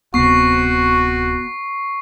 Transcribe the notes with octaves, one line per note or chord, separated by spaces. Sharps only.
D1 C3 B3 F#4 C#6 C7